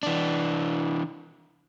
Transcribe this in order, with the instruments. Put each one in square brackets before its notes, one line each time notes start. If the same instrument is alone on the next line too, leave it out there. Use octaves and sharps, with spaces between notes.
[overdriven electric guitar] E3 D4